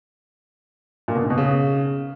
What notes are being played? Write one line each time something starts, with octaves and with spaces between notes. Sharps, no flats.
A#2
B2
G#2
B2
C#3